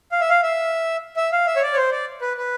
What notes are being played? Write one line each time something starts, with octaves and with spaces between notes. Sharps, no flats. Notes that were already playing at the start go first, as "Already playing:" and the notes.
F5
E5
F5
E5
E5
F5
E5
C#5
D5
C#5
C5
D5
B4
B4